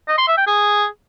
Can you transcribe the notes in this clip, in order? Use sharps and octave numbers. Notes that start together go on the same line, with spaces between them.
D#5
C6
E5
G5
G#4